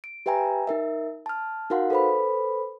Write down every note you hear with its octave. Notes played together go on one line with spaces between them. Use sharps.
D7
G4 B4 E5 G5 G#5 A#5
D#4 A#4 E5
A5 F6
D#4 F#4 A#4 F5 F#5 C6
A4 B4 C5 B5